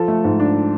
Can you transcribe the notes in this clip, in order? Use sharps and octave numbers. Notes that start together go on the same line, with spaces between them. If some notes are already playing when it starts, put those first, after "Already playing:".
Already playing: F3 A4
A3
G#2
D4